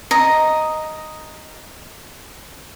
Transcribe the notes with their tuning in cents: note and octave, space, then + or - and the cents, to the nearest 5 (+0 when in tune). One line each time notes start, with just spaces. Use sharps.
D#5 +0 A#5 +0